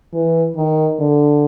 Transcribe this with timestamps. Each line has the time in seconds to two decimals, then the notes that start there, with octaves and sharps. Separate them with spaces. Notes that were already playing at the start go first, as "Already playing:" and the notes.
0.13 E3
0.56 D#3
0.99 D3